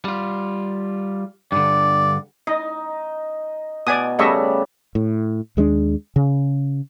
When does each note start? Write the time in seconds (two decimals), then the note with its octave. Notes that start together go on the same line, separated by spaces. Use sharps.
0.05 G3 F4
1.52 G2 D3 D5
2.47 D#4 D#5
3.87 B2 D5 G#5 D#6
4.19 C#3 G3 A3 D#5 E5 C#6
4.95 A2
5.57 D#2 G#3 B3 D4
6.16 C#3